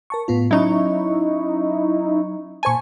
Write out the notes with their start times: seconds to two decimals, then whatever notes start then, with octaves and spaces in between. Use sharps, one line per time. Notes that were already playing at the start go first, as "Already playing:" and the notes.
0.10 A#4 A5 C#6
0.28 A2 B3 F4
0.51 F#3 C#4 D#4 E4 C#6
2.63 A#2 C5 G#5 A5 C#6